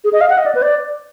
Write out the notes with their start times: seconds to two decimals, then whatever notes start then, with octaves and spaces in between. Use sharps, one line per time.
0.04 G#4
0.13 D#5
0.21 F5
0.30 F#5
0.38 D#5
0.46 D5
0.55 B4
0.62 D5